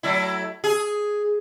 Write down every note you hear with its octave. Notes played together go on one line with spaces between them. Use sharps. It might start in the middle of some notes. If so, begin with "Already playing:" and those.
F#3 A3 E4
G#4